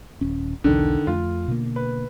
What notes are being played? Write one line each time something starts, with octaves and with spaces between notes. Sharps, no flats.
D#1 C#4
B1 E2 D3 D#3
F2 A3 F4
B2 D3 A#3
B4